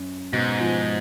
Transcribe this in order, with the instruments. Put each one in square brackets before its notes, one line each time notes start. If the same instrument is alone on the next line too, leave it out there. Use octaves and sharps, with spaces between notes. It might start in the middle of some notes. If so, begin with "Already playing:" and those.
Already playing: [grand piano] F#2
[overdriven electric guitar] G#2 [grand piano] B2
[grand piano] F3